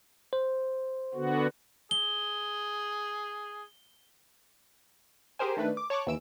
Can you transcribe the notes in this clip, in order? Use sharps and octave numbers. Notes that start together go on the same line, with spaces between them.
C5
D3 B3 F#4
G#4 G7
G4 G#4 A#4 C5 G#5
D#3 A3 D4 B4
D6
C#5 A5 C#6 D6 F#6
D#2 E3 E6 D7 E7